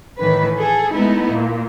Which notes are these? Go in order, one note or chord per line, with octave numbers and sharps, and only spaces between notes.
A2 D#3 E3 B4
G#4 A4
G#3 A3 B3 D#4 E4
A#2